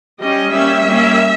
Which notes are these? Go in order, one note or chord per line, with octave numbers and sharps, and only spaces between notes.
G3 C#4 D#5
G3 A#3 C#4 E5
G3 A#3 C#4